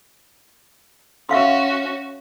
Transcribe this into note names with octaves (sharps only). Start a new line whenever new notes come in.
C#4 F#4 E5 F5 C6